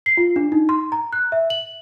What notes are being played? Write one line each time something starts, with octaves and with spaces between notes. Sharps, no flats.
C7
F4
D4
D#4
C6
A#5
F#6
E5
F#7